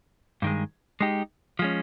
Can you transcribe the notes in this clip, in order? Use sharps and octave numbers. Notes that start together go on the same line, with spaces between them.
G2 D#3 G#3
G#3 D#4 G4
F3 G#3 C#4